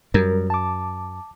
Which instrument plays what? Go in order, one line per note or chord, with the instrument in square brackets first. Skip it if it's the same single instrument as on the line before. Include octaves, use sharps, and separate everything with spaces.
[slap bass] F#2 [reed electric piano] G3 A#4
[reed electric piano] A5 D6